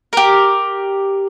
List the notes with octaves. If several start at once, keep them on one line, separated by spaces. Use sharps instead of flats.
G4 A#4